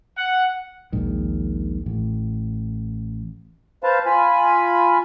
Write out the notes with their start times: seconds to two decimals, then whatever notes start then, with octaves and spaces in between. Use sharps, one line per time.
0.17 F#5
0.92 A#1 D#2 G#2 D#3
1.86 A1
3.84 B4 C5 F5 A5
4.06 F4 G#5 B5